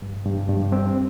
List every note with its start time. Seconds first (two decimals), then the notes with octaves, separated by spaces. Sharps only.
0.02 G2
0.26 G2
0.49 G2
0.72 C4